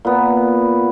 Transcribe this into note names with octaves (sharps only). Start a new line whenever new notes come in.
A#2 B3